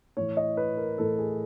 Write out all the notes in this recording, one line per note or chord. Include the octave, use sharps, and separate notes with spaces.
A2 E3 C#5
D#5
B4
A#4
A2 E3 A4
G#4